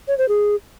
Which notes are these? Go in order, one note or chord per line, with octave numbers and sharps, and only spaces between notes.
C#5
C5
G#4